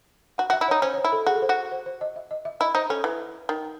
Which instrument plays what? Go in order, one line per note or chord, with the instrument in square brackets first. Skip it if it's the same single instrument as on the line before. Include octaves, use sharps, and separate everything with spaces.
[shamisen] F#4 [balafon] F#5
[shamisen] F#4
[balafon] E5
[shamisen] E4
[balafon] C#5
[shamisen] D#4
[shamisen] C#4 [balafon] C5
[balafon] C#5
C5
[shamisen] E4
[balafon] A4
[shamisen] F#4 [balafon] G#4
[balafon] A4
C5
[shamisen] F#4
[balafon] C5
C5
D#5
E5
D#5
E5
[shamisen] E4 [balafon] D#5
[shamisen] D#4 [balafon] C5
[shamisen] C#4 [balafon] A4
[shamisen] E3
D#3